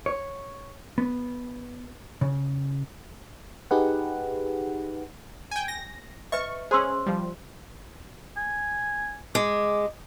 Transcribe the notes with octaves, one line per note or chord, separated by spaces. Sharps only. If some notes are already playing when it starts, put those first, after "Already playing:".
C#5
B3
C#3
D#4 G4 G#4 B4 F#5
G5 G#5
A#6
B4 D#5 E5 C#6
C#4 G#4 C5 C6 E6
F3 G3
G#5
G#3 D6